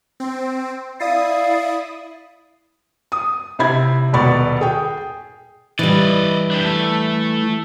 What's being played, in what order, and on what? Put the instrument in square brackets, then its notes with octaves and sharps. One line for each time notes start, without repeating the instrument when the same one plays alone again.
[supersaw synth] C4
[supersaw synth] E4 D#6 [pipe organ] D5 F5
[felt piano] D#6
C3 E4 B5 G#6
D#1 B2 D5 B5 C#6
G#4 G5
[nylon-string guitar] E3 G3 [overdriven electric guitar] D5 D#5
[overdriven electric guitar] D4 G4
A3